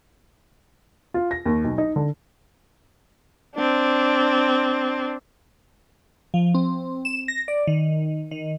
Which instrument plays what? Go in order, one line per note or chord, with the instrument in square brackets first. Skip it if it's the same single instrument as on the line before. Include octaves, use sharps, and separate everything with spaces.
[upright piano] F4
A#6
D#2
B1
D#4
D3
[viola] C4 D4
[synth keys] F3
C4
E7
A#6
D5
D#3
D#3